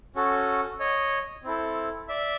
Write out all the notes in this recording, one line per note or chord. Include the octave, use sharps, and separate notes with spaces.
C#4 F#4 A4
C#5 D#5
C4 E4 A4
D5 E5